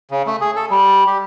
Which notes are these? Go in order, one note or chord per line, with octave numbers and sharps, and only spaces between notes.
C#3
A3
G#4
A4
G3
G4